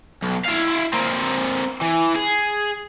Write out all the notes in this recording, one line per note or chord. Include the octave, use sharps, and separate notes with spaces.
B1
E4 F5
A#3 C4
E3
G#4